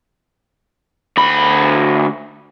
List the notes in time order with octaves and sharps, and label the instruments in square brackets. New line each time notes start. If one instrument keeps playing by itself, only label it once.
[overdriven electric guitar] D2 B5